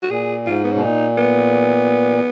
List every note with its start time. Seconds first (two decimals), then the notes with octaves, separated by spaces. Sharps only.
0.02 F#4
0.10 A#2 G#4
0.47 G#2 F4
0.64 B3
0.73 B2 C#4
0.82 A#2 D#4
1.18 B3